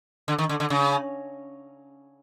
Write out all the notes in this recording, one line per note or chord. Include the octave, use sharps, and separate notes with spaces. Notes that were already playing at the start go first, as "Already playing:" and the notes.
D3
D#3
D3
D3
C#3